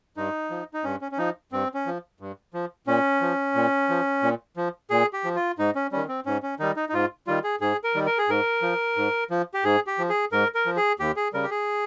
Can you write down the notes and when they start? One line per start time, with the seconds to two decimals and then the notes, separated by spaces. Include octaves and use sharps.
0.17 G2 D#4
0.50 F3
0.74 D#4
0.84 G2 C#4
1.02 C#4
1.12 C#4
1.18 F3 D#4
1.52 G2 C4
1.74 C#4
1.86 F3
2.20 G2
2.54 F3
2.87 A#2 C#4
3.21 F3
3.55 A#2
3.89 F3
4.23 A#2
4.57 F3
4.90 A#2 G#4
5.13 G4
5.24 F3
5.36 F4
5.59 G#2 D#4
5.75 C#4
5.92 D#3 G3 C#4
6.08 C4
6.26 G#2 C#4
6.43 C#4
6.59 D#3 G3 D#4
6.76 D#4
6.89 D#4
6.93 G#2 F4
7.27 D#3 G3 F4
7.44 G#4
7.61 G#2 G#4
7.84 A#4
7.95 D#3 G3
8.06 A#4
8.18 G#4
8.29 G#2 A#4
8.62 F3
8.97 G#2
9.30 F3
9.54 G4
9.64 G#2 G#4
9.87 G4
9.98 F3
10.09 G#4
10.32 G#2 A#4
10.55 A#4
10.66 F3
10.77 G#4
11.00 D#2 G4
11.16 G#4
11.33 C#3 G3 A#4
11.43 G4
11.50 G#4